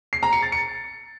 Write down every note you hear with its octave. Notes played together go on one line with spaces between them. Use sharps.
C7
A#5
C#7
A6
C#7